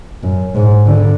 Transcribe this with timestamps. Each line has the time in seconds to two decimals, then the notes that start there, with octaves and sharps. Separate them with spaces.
0.23 F#2
0.55 G#2
0.86 D3